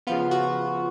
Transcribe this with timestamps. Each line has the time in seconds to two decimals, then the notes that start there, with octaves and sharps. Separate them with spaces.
0.07 C#3 F3 B3 F4
0.31 F#4